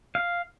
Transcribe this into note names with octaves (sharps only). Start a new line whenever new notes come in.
F5